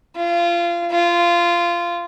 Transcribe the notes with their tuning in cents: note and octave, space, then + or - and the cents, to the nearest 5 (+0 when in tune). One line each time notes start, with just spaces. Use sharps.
F4 -25
F4 -15